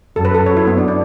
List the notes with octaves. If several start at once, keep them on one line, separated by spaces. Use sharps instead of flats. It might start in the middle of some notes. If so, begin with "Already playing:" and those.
F#2 A4
B4
A4
F#2 C#5
E4
B3
D4
D4